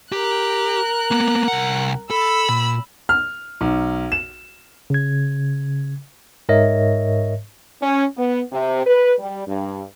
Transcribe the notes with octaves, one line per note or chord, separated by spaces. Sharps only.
G4 A#4 F#6
A#3 B3
C2 F#5
A4 B5 E6
A#2
F6
B1
E7
C#3 G#6
G#2 A#4 C#5 D#5 E5 A#6
C#4
B3
C3
B4
G3
G2